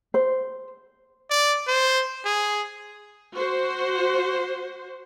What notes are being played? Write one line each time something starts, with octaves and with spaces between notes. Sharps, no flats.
C5
D5
C5
G#4
F#4 C5